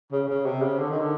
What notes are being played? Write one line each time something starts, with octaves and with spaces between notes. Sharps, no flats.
C#3
C#3
C3
C#3
D3
D#3
D3